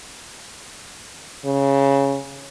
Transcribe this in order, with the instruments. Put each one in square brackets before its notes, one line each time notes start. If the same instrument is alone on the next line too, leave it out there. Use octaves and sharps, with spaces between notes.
[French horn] C#3